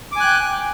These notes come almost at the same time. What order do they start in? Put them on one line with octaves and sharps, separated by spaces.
D6 G#5 F#6 G5